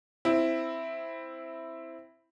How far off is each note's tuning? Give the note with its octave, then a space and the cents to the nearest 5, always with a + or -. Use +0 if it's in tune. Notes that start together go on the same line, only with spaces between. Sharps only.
C4 +0 E4 +0